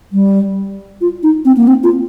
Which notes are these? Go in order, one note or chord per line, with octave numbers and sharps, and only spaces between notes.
G3
F4
D#4
C4
A#3
C4
F4